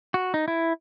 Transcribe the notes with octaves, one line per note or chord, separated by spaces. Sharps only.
F#4
D#4
E4